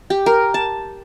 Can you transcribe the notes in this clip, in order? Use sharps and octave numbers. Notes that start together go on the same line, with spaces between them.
G4
A#4
A5